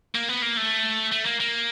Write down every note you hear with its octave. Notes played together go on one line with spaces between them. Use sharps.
A#3
B3
A#3
A3
A3
A#3
A#3